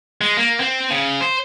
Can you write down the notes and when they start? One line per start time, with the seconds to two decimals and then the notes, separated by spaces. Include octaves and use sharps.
0.21 G#3
0.37 A#3
0.60 C4
0.91 C#3
1.21 C5